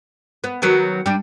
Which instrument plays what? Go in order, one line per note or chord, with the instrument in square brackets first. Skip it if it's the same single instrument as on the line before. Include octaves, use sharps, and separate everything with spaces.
[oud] B3
D#3 F#3 B3
G3 D4